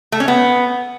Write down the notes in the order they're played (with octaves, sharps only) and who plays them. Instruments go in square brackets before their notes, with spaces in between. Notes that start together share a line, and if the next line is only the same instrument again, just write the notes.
[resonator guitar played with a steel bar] A3
C#4
B3